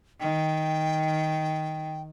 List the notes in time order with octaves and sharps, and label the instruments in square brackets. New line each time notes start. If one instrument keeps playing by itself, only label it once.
[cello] D#3 [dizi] G5